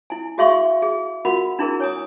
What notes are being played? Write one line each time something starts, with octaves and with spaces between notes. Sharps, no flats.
E4 G#5
F#4 G#4 E5 F5 C6 C#6
G#4
F4 F#4 A#4 F#5 B5
D4 E4 G#4 A#4
C#5 G#5 D#6